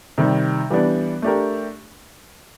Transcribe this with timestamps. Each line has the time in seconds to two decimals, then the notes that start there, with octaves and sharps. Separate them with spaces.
0.18 C3 D#3 G3
0.70 E3 G3 B3 D4
1.22 A3 D4 G4 A#4